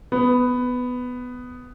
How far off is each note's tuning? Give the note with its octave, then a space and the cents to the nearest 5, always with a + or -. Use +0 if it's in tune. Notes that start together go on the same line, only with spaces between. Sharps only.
B3 +10